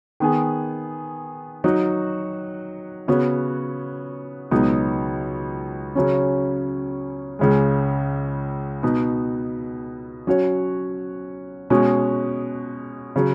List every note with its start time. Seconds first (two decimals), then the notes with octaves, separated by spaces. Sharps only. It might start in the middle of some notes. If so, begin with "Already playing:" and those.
0.20 D#3 B3 G#4
1.64 F#3 D#4 F#4
3.08 C#3 B3 F#4 C#5
4.51 C#2 B2 F#3 B3 D#4
5.95 C#3 F#3 C#4
7.39 C#2 C#3 G#3
8.83 B2 B3 D#4
10.27 F#3 C#4 F#4 C#5
11.70 B2 G#3 C#4 F#4
13.16 C#3 F#3